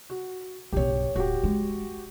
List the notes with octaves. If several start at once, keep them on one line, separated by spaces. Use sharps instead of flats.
F#4
B1 G2 G4 C#5
D1 F#4 G4
G#3